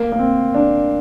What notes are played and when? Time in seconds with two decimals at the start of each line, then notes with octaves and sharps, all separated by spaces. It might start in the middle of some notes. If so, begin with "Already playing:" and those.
Already playing: A#3
0.12 A#3
0.19 C4
0.54 D4